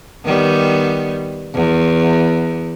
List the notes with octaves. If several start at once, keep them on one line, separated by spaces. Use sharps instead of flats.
D#3 G3 B3
E2